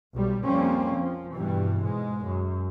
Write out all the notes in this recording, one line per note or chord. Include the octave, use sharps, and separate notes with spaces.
B1 G3
F2 G3 A#3 C4 C#4
F3
G2 B2 E3 G3
G#2 G#3
F#2